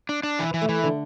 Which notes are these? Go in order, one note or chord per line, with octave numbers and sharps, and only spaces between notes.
D4
D4
E3
E3
A3
E3
D3